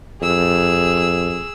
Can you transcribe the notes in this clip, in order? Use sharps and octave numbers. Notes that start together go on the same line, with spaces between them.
F2 G#4 E6